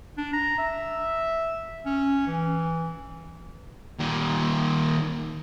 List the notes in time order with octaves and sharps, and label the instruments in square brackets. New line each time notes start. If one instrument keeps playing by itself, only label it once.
[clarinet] D4
A#5
E5
C#4
E3
[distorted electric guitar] A#2 D#3